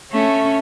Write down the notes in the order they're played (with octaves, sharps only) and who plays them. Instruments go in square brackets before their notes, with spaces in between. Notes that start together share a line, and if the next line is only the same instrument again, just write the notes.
[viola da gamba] A3 C#4